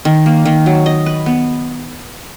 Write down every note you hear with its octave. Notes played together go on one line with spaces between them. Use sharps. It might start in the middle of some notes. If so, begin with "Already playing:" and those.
D#3
A#3
D#3
F#3
D#5
B4
B3